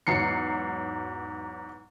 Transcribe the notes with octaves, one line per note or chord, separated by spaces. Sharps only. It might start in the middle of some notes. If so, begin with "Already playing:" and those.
E2 G#2 F#3 C7 C#7